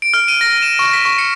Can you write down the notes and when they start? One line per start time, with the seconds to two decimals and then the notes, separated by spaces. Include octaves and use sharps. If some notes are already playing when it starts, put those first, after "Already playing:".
0.02 D7
0.14 F6
0.28 D#7
0.41 A#6
0.62 E7
0.79 C#6
0.93 B6
1.05 C#6
1.18 C#7